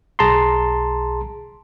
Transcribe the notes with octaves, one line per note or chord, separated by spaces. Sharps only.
B1 G#4 A5 A#5 C6